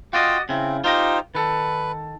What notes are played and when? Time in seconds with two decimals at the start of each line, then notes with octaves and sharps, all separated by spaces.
0.13 F4 F#4 D5 D#5 F5 G5
0.49 C#3 C4 E4
0.84 D#4 F4 G4 C5 A#5
1.35 D#3 A4 B4